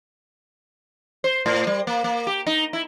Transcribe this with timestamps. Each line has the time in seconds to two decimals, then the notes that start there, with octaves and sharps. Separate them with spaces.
1.24 C5
1.46 A2
1.67 G3
1.87 A#3
2.04 A#3
2.27 G4
2.47 D#4
2.73 E4